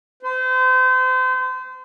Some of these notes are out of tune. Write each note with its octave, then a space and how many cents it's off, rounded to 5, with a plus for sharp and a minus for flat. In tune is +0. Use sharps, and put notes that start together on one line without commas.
C5 -35